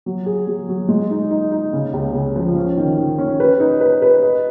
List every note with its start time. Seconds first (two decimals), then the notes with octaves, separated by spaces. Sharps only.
0.06 F#3
0.26 G#4
0.47 F#3
0.68 F#3
0.89 G#3
1.11 D#4
1.31 D#4
1.52 D#4
1.73 C#3
1.93 C#2
2.14 C#3
2.36 F3
2.55 C#4
2.77 D#3
2.98 D#3
3.18 C#4
3.40 B4
3.60 D#4
3.81 B4
4.02 B4
4.23 D#5